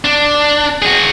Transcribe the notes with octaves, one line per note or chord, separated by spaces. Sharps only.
D4
F#4 G#4